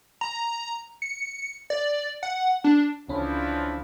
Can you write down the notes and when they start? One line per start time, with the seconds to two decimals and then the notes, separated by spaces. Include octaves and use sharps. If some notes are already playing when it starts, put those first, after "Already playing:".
0.21 A#5
1.02 C#7
1.70 D5
2.23 F#5
2.64 D4
3.09 C#2 D3 E3 F3 C#4 B5